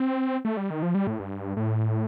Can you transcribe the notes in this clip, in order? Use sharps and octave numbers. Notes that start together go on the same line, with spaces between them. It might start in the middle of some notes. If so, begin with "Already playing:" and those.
Already playing: C4
A3
G3
D#3
F3
G3
A2
G2
A2